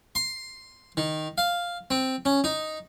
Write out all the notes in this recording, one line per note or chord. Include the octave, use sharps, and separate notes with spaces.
C6
D#3
F5
C4
C#4
D#4